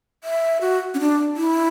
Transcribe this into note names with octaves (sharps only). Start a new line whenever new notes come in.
E5
F#4
C#4
D4
E4